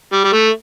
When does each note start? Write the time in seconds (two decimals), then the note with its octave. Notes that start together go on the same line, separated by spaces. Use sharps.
0.13 G3
0.24 G3
0.33 A3